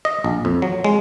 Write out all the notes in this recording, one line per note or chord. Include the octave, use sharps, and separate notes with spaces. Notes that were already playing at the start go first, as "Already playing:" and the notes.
D#5
A#1
F2
F#3
G#3